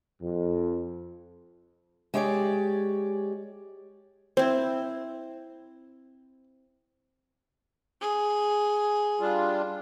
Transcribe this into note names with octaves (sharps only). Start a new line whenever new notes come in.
F2
G#3 G4 C#5 D5
C4 E4 C5
G#4
G3 D4 F4